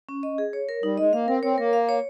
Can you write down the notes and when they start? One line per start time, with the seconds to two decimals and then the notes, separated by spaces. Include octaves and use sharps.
0.09 C#4
0.23 D#5
0.38 G#4
0.53 C#5
0.69 A#4
0.83 G3 D#4
0.98 G#3 D#5
1.13 A#3 F5
1.28 C4 A#4
1.43 C4 C#5
1.58 A#3 A#4
1.73 F5
1.89 C#5